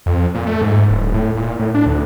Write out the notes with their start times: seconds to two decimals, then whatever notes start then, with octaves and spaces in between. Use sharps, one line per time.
0.06 F2
0.35 A#2
0.47 A3
0.62 G#2
0.90 D1
1.14 A2
1.37 A#2
1.60 A2
1.75 D4
1.86 D2